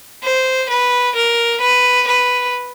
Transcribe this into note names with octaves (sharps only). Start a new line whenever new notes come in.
C5
B4
A#4
B4
B4